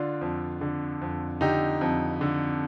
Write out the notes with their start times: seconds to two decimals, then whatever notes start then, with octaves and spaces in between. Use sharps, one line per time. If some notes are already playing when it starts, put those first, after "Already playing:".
Already playing: D3 D4 F4
0.21 F2
0.61 D3
1.02 F2
1.41 D3 D#4 G4
1.81 F2
2.21 D3